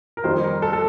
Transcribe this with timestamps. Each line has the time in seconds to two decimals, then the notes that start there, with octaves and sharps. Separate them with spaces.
0.17 A#4
0.24 F2 D#3 G3 C5
0.44 A#4
0.62 A4
0.73 A4